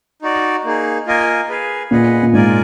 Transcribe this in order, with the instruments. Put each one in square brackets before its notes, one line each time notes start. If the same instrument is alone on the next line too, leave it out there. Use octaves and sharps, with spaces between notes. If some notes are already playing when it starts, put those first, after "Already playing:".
[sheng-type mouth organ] D#4 F#4 D5
A#3 D#4 G#4
A#3 F4 A#4 D#5 G#5
G#4 B4 F5 G#5
[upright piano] A#2 [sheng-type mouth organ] G#4 B4 D#5 F#5
[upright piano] A#2
[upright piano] G#2 [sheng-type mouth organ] F4 A#4 D5 G#5